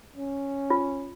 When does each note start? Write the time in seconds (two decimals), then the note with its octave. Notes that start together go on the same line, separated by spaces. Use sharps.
0.16 C#4
0.70 F4